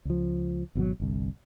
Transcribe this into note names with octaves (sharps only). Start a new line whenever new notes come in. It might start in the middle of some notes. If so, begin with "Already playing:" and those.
C#2 F3
G#1 B2 D#3 F#3
G1 C2